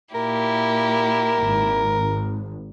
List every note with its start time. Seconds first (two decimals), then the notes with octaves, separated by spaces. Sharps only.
0.14 A#2 E4 G4 A#4
1.39 G#1